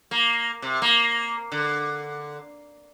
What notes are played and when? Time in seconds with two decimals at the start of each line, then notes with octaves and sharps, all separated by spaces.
0.11 A#3
0.62 C3
0.82 A#3
1.52 D3